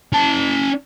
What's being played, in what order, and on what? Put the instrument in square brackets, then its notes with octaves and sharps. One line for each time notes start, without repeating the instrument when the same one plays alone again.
[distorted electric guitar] C#4 A5